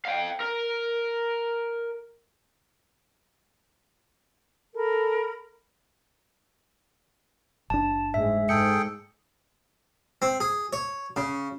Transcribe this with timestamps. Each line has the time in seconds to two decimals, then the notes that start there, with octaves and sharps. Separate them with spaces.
0.05 F5 G5
0.40 A#4
4.76 A4 A#4 B5
7.70 F#1 D4 A5
8.14 G#2 G#3 E5
8.49 G#2 G#4 A4 G5 C#7
10.22 C4
10.40 G#4
10.73 C#5
11.16 C#3